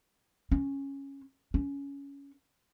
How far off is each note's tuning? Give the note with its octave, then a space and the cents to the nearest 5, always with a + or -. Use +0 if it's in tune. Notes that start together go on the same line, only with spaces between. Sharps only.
C#4 -5
C#4 +15